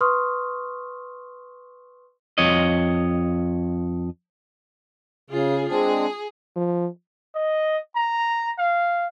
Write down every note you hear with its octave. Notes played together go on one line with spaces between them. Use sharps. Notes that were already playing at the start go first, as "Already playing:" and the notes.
B4 C6 C#6 D#6 F6
F2 C#5 D#5
C#3 F4 G#4
G#3 C4 D4 G#4
F3
D#5
A#5
F5